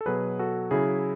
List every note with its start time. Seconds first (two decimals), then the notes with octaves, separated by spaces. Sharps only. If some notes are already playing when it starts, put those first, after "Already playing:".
0.01 A4
0.06 B2 F#3 G#4 B4
0.39 F#4 A4
0.71 C#3 F#3 E4 G#4